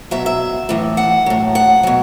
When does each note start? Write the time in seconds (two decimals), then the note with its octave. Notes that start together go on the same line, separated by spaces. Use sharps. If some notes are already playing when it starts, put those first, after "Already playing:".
0.11 B2 F#3 E5
0.26 E5
0.69 A2 E3
0.97 F#5
1.26 A2 F#3
1.55 F#5
1.83 B2 F#3